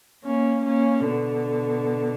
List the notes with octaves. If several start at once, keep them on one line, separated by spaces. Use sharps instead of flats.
A#3 C#4
A#3 C#4
B2 D3